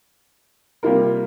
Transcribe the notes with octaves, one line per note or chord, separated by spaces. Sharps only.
C3 G3 A#3 F4 A#4